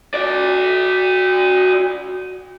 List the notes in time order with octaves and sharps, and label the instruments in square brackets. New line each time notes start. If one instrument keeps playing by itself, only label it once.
[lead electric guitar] F#4 D5